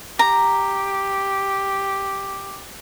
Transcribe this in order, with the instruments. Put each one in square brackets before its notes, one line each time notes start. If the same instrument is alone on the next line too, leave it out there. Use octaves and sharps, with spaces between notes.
[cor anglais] G4 [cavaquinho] A#5